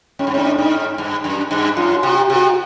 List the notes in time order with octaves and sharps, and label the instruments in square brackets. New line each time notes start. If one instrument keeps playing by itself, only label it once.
[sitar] G#2 [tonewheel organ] C#4
[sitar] G2
[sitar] G#2 [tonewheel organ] D4
[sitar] G#2 [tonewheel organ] D#4
[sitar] G2
F#2
G2
[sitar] F#2 [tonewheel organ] F4
[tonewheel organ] F#4
[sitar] C3
[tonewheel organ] G4
[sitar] C3
[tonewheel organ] F#4